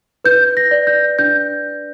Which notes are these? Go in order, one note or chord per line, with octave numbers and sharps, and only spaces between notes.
B4 G6
A#6
D5
G6
D4 G6